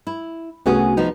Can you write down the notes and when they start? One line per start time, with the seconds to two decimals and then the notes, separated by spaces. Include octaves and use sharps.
0.07 E4
0.66 C2 A3 B3 C#4 F#4 G#4
0.97 F3 B3 D#4